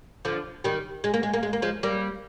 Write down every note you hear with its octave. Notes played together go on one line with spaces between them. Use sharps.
D3 F3
D#3 G3
G#3
A#3
G#3
A#3
G#3
A#3
F3 G#3
G3 A#3